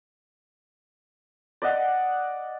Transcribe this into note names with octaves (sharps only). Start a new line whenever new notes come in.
D5 D#5 F#5